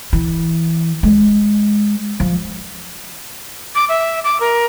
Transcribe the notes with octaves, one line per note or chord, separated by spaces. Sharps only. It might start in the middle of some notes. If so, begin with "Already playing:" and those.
E3
G#3
F3
D6
E5
D6
A#4